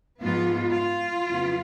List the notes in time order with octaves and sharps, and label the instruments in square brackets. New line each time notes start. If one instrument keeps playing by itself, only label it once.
[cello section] G#2 F3 G#3 B3 F4
F4
F2 C#3 F#3 B3